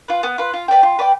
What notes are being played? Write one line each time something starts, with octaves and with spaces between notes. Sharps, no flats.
F4 B4
B3
F4 B4
F4
B4 D5 G5
F4
B4 D5 G5